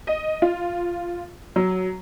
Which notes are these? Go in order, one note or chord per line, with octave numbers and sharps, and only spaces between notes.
D#5
F4
F#3